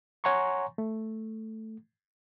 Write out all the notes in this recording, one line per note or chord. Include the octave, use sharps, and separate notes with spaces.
C#5 F#5 G#5 A#5 C6 C#6
A3